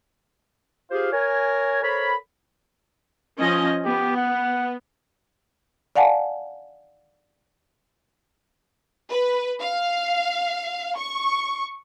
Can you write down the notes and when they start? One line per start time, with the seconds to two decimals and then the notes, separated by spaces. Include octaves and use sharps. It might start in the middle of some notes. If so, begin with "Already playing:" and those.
0.91 F4 G4 G#4 C5 F5
1.13 A#4 C#5 G#5
1.83 A4 A#4 C5 C#5 B5
3.38 F3 C#4 D#5
3.86 B3 G4
4.17 F#5
5.96 D5 F5 F#5 G#5 A5
9.11 B4
9.59 F5
10.97 C#6